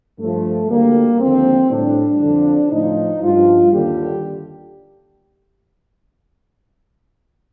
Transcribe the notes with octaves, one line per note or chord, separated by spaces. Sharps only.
G2 F3 A3
D2 D3 G3 A#3
D#2 D3 F3 C4
A2 G3 D4
F2 D3 F3
A2 F3 D#4
G2 F3 F4
D#2 D3 G3 G4